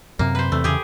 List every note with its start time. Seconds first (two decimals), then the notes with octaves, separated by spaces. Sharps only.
0.19 F#2 C3 A#3
0.35 B4 C5
0.52 E2 C3 A3
0.64 E2 C#3 G4 G#4